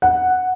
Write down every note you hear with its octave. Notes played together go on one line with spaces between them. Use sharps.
F#5